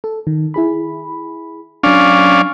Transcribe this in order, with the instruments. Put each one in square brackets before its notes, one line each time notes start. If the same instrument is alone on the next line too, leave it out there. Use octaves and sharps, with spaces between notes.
[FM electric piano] A4
D#3
E4 G#4 B5
[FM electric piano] F#3 D4 [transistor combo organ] C#4 D5 F5